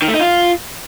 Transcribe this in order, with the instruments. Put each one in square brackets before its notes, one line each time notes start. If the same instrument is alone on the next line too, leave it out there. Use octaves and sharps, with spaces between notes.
[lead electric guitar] D#3
A3
D#4
F4